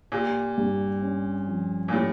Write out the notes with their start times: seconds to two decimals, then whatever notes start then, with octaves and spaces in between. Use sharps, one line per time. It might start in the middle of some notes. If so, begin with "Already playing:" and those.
0.12 A#2 G4
0.58 G2
1.02 C#4
1.47 F3
1.88 A#2
1.93 A2 G4